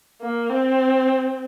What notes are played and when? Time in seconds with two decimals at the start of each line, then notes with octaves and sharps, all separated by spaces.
0.22 A#3
0.49 C4